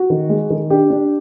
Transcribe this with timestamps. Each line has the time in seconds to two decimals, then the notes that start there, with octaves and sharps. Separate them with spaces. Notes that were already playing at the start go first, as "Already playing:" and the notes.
Already playing: F#4
0.10 D#3
0.29 G#3
0.50 D#3
0.70 D4 G4
0.90 D4